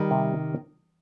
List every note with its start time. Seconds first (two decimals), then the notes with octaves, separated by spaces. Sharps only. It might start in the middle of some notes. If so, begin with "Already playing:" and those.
Already playing: D#3 G3
0.11 C3